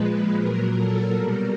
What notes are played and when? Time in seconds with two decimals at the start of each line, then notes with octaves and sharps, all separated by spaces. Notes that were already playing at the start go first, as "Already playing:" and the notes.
Already playing: A#2 F3 G#3 B4
0.40 A#2 F#3 A#4
0.77 A4
1.13 B2 G3 A#4